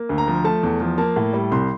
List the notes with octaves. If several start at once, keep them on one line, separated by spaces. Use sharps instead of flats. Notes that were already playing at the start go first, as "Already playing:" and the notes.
Already playing: A#3
D2
A#5
F3
A3 A5
E2
F3
A#3 A5
A2
G3
C2 C6